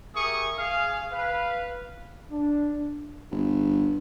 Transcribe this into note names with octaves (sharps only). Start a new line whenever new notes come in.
G4 G#4 A#4 E5 C#6 D#6
G#4 F5
B4 F5
D4
G1